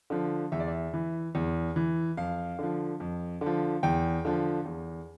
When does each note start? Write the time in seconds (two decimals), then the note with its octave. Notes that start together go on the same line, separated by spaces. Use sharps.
0.10 D3 F3
0.52 E2 E5
0.60 D5
0.68 E5
0.94 E3
1.35 E2
1.76 E3
2.17 F2 F5
2.59 D3 F3
3.00 F2
3.41 D3
3.46 F3
3.83 E2 G5
4.25 D3 F3
4.65 E2